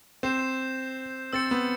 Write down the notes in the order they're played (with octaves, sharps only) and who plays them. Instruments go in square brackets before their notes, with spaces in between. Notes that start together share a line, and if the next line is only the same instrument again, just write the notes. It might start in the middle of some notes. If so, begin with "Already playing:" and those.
[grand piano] C4 [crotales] G6 C7 E7
[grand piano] C4 [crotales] E6 A6 C#7
[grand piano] B3